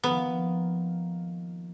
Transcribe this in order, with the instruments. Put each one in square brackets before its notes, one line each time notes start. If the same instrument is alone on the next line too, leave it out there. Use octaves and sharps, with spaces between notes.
[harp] D#3 F3 A#3 [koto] B3